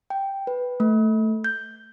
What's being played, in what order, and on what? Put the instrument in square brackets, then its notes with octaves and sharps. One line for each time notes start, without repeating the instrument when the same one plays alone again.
[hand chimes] G5
B4
A3
G6